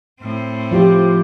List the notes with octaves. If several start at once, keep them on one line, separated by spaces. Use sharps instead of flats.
A2 C4
F3 F4 G4